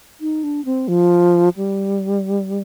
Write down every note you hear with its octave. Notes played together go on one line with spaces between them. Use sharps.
D#4
D4
C4
F3
G3